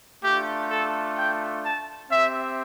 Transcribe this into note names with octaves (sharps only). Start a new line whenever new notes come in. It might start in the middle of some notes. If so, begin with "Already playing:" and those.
A3 D4 F4 G4
A4
G5
A5
C4 G4 E5